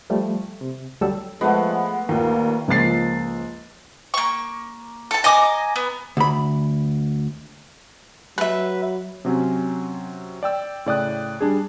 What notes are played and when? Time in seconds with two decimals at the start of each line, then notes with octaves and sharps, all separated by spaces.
0.10 F3 G3 A3
0.61 C3
1.01 D2 F#3 G3 A4 E6
1.41 F3 G#3 A3 B3 F#5
2.09 D#2 A#2 A#3
2.68 C#2 F3 A#3 A6 C7
4.14 A#3 C#6
5.11 A4 A5
5.24 D#5 G#5 A#5 D6
5.76 B3
6.17 D2 B5
8.38 F#3 B4 E5
9.25 C3 F#3 C4 C#4
10.43 D5 G5 E6
10.86 A2 C#3 D5 G5 D#6 F#6
11.41 G3 D4 G#4